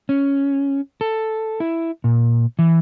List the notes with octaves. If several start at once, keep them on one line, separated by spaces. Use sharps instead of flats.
C#4
A4
E4
A#2
E3